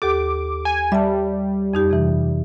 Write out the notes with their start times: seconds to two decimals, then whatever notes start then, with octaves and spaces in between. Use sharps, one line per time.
0.02 D#2 G4 A4 D6
0.65 G#5
0.92 G3 E5 A5
1.74 F2 D#4 G4
1.89 F2 C3 E3